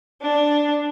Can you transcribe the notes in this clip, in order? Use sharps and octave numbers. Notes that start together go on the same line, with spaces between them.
D4